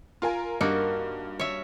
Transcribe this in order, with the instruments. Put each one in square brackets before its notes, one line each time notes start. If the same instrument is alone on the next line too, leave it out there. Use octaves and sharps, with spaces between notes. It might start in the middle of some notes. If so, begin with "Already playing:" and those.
[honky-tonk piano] F4 A#4 G#5
[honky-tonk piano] G2 [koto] A#3 D#4 F#4
[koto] C#5 E5